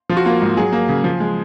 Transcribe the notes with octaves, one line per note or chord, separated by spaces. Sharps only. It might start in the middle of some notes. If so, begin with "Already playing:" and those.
F3 F4
F#4
A#3 F4
G#2
F#3 G#4
A#3
C#3
F3
G#3